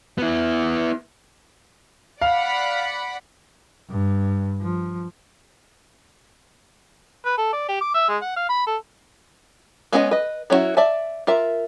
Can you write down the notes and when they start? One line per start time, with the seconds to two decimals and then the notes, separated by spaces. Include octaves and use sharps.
0.18 B3 E4
2.21 D5 F5 F#5 B5
3.90 G2
4.61 F3
7.25 B4
7.38 A4
7.53 D5
7.69 G4
7.81 D6
7.95 E5
8.09 G#3
8.22 F#5
8.36 F5
8.49 B5
8.67 A4
9.92 G#3 B3 C#4 B4 D#5
10.11 B4 D#5
10.50 F#3 C#4 D4 E4 F#4
10.77 D5 E5 A5
11.27 F4 A#4 E5